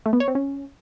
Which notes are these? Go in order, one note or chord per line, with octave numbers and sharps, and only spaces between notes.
A3
B3
C#5
C4
C#4